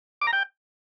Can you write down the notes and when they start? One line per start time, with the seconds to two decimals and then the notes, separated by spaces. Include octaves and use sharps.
0.21 D6
0.27 A#5
0.33 G5